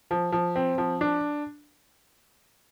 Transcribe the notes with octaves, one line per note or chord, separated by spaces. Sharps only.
F3
F3
C4
F3
D4